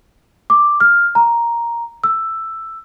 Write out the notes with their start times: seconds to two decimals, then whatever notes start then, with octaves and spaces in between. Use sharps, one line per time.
0.50 D6
0.80 F6
1.15 A#5
2.04 E6